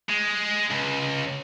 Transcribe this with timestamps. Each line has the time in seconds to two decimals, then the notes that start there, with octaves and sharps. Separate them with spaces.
0.10 G#3
0.71 C#2